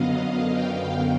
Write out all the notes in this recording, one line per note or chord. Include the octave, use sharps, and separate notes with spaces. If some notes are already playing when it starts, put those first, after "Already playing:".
Already playing: F#2 D3 F#3 B3 D#5 F5
F5 G5